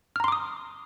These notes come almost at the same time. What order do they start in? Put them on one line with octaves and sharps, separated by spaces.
F6 A#5 C6 D6 D#6